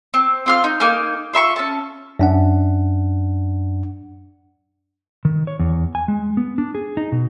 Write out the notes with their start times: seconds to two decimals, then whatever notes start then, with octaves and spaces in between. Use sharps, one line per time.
0.14 C4
0.46 C4 F4 F6
0.64 D#4
0.80 A#3 D#4 G#5 F6
1.33 F4 E5 B5 C#6
1.56 C#4 A5
2.19 F#2 D4 F#5
5.25 D#3
5.47 C#5
5.59 E2
5.95 G#5
6.08 G#3
6.37 B3
6.58 D4
6.75 G#4
6.97 D#4
7.12 B2